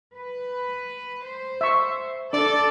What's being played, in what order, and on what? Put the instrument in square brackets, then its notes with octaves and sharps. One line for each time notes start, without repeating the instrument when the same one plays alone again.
[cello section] B4
C5
[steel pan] E5 C#6
[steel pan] D4 D6 [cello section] A4 [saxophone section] D5